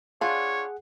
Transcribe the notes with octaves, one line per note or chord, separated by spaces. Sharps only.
D4 F4 G#4 C#5 F#5